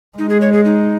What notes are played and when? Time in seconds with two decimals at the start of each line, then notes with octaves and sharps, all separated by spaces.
0.18 G#3 D#4
0.29 G#4
0.41 C#5
0.53 G#4
0.65 D#4